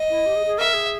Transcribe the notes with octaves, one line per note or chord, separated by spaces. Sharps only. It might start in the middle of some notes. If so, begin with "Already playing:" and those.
Already playing: D#5
E4
G4
G#4
G#4
A#4 E5
G#4